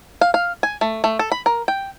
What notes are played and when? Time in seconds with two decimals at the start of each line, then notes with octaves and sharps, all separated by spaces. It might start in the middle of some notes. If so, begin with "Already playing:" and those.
0.21 F5
0.34 F5
0.63 G#5
0.81 A3
1.04 A3
1.19 A4
1.32 B5
1.46 A#4
1.68 G5